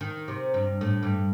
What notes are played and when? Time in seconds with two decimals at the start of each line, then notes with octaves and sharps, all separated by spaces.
0.01 D#3
0.28 C3
0.54 G2
0.81 A2
1.03 G2